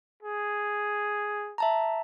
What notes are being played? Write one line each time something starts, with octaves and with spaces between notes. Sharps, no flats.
G#4
E5 A5 A#5